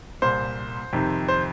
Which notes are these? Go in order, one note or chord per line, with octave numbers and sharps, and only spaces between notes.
C2 A#2 C5
F2 C3 D#3
C5